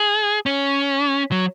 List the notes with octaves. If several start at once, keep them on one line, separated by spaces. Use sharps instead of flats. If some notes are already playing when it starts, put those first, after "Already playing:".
Already playing: G#4
C#4
F#3